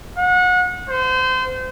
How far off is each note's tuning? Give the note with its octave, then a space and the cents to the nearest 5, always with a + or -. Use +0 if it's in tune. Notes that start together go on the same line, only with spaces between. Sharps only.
F#5 -30
C5 -30